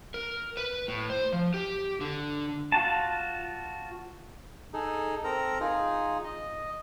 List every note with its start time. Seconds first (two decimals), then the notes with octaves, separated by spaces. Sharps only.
0.14 A#4
0.57 B4
0.88 A2
1.10 C5
1.33 F3
1.54 G4
2.01 D3
2.72 F4 F#4 A5
4.74 D#4 G#4 A4
5.24 C4 A4 A#4 A#5
5.61 D#4 F4 G#4
6.24 D#5